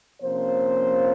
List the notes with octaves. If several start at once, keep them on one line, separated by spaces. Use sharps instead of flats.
C3 F3 A#3 C#4 C5